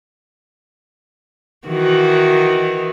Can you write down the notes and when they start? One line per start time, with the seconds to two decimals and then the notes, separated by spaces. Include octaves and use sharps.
1.67 D#3 E3 F#4